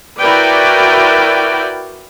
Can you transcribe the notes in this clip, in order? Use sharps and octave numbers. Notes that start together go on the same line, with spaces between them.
E4 F#4 A#4 B4 D5 G5